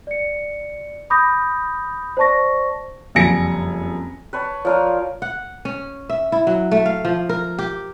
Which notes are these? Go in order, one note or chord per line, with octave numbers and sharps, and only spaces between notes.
D5 C#7
B5 D6 D#6 G6 A#6
C5 D5 A5 C#6 A#6
F#1 F2 G3 G#5 A#6 C#7
B4 C#5 A5
F3 A#4 C#5 D5 F5
F#5
C#4
E5
E4
F#3
A3
F5
F3
A#4
G4